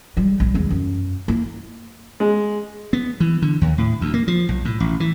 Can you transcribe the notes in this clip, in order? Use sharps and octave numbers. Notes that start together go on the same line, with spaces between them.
G3 G#3
A#1
E2 G#3
F#2
A#3 E4
G#3
B3
E3
D3
D#2
A2
D2
A#3
F3
B1
A2
A1
E3